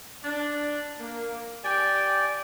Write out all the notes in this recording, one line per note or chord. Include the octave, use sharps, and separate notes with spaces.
D4
A#3
G4 D5 G5 G#5